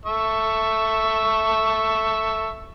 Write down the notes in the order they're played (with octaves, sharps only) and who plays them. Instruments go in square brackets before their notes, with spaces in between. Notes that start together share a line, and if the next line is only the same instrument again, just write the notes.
[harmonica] A4 E5 C#6